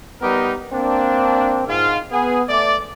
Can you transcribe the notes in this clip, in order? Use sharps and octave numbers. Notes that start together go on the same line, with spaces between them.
G3 B3 D#4 G4 A#4
A#3 C4 D4
G#2 F4
B3 G#4
A3 D5